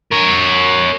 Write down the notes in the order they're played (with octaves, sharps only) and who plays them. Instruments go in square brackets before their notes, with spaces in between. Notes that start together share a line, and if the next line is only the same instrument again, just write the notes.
[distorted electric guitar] A#4 C#5